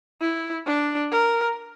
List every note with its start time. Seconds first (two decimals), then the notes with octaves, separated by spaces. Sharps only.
0.21 E4
0.66 D4
1.11 A#4